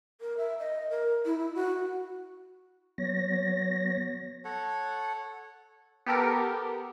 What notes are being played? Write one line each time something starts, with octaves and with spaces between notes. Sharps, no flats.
A#4
E5
D#5
A#4
E4
E4
F#4
F#3 B3 C#5 A#6
A4 C#5 F#5
B3 G4 A4 A#4